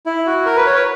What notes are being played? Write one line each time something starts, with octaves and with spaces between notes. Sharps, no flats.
E4
F#4
A#4
B4
C#5
B4